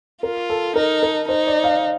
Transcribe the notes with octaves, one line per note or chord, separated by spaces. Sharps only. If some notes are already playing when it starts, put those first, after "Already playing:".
F4 A#4
A4
D#4 A#4
A#4
D#4 C5
D5
F5